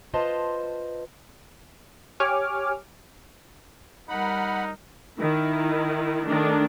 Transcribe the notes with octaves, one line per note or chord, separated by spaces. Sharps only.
F4 B4 C5 D#5 A5
G4 C#5 G#5 D6 F6
G3 D#4 A#4 F#5 B5 F6
D#3 E4
D#3 A3 D4